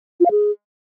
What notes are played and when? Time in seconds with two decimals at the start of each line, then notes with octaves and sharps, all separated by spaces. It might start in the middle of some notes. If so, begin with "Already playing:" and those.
0.20 F4
0.25 F5
0.31 G#4